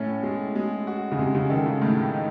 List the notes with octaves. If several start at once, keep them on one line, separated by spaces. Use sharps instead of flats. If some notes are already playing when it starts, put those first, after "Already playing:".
Already playing: A2 C#4
G#3
G#3
F#4
C#3
C3 G#3
C#3
D#3 A4
C#3
A2 D#3
D#4